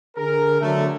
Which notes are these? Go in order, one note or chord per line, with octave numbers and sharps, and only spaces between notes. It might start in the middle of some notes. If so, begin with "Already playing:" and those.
D3 G#4 A#4
D3 F#3 A3